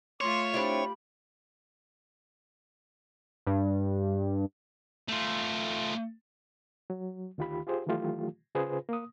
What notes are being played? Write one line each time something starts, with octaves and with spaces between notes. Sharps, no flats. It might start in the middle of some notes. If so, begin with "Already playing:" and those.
A3 F4 C#5 C6 D6
C4 D4 E4 G4 B5
G2
A3 F4
F#3
D2 D#3 F4 G4 B5
F4 G4 G#4 C5
D#3 E3 F#3 A3 F4 G4
C#3 F4 G#4 B4 C5
A#3 D#6